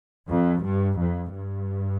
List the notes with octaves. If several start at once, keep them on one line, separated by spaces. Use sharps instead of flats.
F2
G2
F2
G2